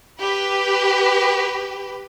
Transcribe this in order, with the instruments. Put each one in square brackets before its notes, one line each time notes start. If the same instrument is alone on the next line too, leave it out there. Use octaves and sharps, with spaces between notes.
[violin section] G4 B4